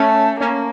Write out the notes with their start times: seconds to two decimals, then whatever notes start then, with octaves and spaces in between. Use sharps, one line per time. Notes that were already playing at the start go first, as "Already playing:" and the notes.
Already playing: A3 C#4
0.40 A#3 C#4